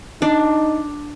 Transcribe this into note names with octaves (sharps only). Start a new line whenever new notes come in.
D4 D#4